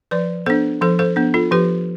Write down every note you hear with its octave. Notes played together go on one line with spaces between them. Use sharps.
F3 B4 D5
B3 D4 A4 C5
F3 A4 C5
A4 C5
B3 D4
F4 A4
F3 G4 B4